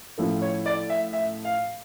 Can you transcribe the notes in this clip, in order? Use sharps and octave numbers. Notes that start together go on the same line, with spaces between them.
A2 F3 C#4 E4 A4
C#5
D5
E5
E5
F5